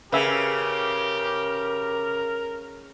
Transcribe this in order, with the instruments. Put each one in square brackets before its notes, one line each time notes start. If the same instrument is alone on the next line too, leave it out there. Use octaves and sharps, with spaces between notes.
[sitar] C#3 [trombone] G4 [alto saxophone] A#4 [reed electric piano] B4 E5 G#5